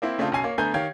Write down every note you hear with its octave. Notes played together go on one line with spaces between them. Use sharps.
A#3 C4 E4
C#3 A3 C4 D4 F4
B1 C#4 G#5 C7
A#3 C#5
D3 A3 B3 G#5 A#5 G6
D#3 G4 C#5 F5 G5 G#6